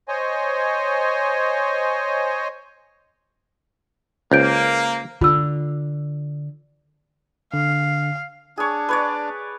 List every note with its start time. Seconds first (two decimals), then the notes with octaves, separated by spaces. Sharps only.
0.08 C5 C#5 D#5 G#5
4.32 C#2 A#3 C5 G6 D7
5.21 D3 F4 E6
7.54 D3 F5
8.57 D4 G#4 C#5
8.89 B4 C#5 D5